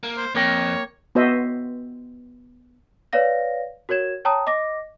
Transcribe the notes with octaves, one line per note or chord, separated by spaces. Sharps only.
A#3
C5
F2 A#3 A#4 C#5 G5
B3 F#4 C5 D#5 E5
B4 C#5 D5 F5 A#6
F#4 A#4 C#5 G#6 E7
C#5 G5 A5 A#5 D#6
D#5 D6 A#6